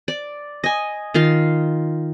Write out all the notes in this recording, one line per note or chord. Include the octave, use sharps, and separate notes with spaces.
D5
D#5 G#5
D#3 F4 F5 C6